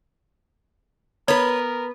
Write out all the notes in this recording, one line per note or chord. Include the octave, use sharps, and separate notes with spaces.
B3 A#4 B4 C#5